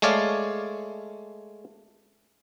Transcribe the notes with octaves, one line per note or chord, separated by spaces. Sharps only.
G#3 A3 C#5 D5 F5